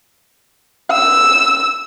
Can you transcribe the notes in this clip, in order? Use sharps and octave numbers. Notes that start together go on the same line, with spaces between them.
E6